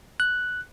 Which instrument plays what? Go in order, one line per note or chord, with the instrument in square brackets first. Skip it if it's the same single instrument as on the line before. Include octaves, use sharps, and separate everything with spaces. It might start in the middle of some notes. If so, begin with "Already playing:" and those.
[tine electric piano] F#6